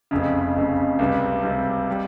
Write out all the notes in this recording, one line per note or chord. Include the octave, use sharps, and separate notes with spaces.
F1 F2 C#3
F1 F2 C#3
C#2 C3 G3
C#2 C3 G3
G3